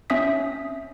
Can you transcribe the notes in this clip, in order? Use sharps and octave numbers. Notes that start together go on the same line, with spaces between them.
C4 C#4 E5 D#6 B6